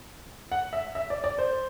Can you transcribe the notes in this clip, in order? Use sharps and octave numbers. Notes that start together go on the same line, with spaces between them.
F#5
E5
E5
D5
D5
C5